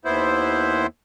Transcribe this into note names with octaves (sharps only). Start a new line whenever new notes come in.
D#2 B3 E4 C5